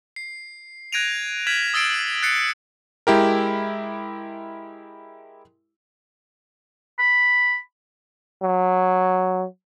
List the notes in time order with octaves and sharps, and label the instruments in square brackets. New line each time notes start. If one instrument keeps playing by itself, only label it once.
[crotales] C7
F#6 G#6 A#6 D7 D#7 F7
F6 G#6 B6 D#7 E7 F#7
D#6 E6 A6 C7 D7 E7
F#6 A6 C7 C#7
[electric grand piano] G#3 E4 G4 A#4
[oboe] B5
[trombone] F#3